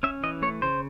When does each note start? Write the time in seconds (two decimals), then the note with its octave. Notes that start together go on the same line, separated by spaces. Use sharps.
0.03 C#4 E5
0.23 E3 D#5
0.42 A3 C#5
0.62 C#3 C5